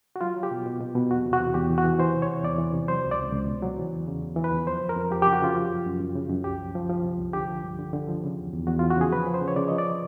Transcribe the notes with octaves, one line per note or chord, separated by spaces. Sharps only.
F#4
F#3 F4
F#3
G4
B2
B2
B2
B2
E2 F#4
C3
F#4
E2
E2 G4
E3
F#4
E3
E3 C5
C3
C#5
E2
E2 D5
E3
C3
F#3 C5
C#2
D5
C#2
C#2
B2
F#3
E3
E2
C#3
E2
E3
B4
E2
F3 C5
F2
A#4
F2
F3 G4
C#3 G4
F#4
C#3 F4
F3
F#2
F#2
F#2
C#3
F#2
C2 G4
F3
F3
F3
C3
C2
D3 G4
F3
G2
D3
D3
F3
C#3
E2
E2
E2 F#4
E3 F4
F#4
C#3 G#4
F3 B4
F3
C5
C#3
C#5
C#3 D5
F3 D#5
D5